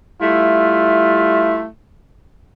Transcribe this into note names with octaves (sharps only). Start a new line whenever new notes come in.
G3 A3 E4 F4